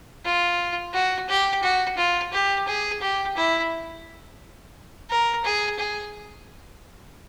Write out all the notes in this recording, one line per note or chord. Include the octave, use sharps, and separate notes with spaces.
F4
F#4
G4
F#4
F4
G4
G#4
G4
E4
A#4
G#4
G#4